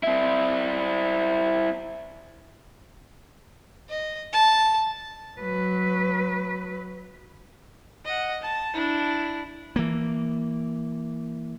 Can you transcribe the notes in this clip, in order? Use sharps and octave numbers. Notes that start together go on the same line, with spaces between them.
C4 E4
D#5
A5
F#3 B4
D#5 F#5
A5
D4 E4
E3 A#3